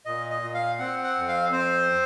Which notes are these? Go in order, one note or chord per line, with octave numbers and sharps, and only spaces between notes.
A#2 D#5
D#5
A#2
F5
C4 F#5
F#5
F2
F5
C4 C5